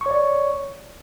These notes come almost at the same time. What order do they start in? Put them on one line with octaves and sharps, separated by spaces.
C#6 C#5 D5